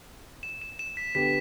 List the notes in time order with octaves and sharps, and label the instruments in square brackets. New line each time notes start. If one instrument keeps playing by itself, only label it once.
[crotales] E7
E7
E7
B6
[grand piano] D3 B3 G4 [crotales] B6